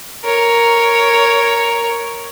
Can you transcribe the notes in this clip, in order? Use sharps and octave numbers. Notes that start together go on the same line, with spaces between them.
A#4 C#5